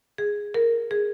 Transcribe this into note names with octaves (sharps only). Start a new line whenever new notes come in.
G#4
A#4
G#4